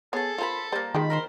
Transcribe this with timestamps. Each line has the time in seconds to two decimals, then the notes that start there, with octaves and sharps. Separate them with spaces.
0.13 B3 G#4 A4 C#5 A5
0.38 F4 A#4 C5 G#5 B5
0.72 G3 A#3 C5 A5
0.94 D#3 F3 G#3 G4 B5
1.10 A#4 C5 C6